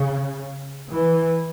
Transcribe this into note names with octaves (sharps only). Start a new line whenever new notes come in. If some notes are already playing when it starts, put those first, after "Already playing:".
Already playing: C#3
E3